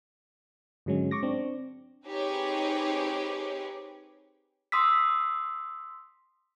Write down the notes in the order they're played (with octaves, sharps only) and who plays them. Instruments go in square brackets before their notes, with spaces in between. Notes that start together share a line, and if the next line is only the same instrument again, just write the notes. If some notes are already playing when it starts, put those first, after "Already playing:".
[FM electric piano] G#2 D3 F#3 G#3 C#4
C#6 D6 A#6
C4 D4
[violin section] C4 D#4 G4 G#4 B4 C#5
[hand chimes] C6 D#6 E6 B6